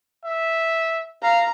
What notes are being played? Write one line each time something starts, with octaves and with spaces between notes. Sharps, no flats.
E5
F5 A#5